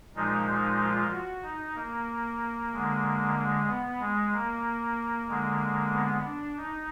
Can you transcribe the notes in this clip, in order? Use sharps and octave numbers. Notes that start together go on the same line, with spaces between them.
A#2 F3 G#3 D#4
D#4
F4
F#4
D#4
A#3
D3 G#3
G#3
B3
G#3
A#3
D3 G#3
B3
D4
D#4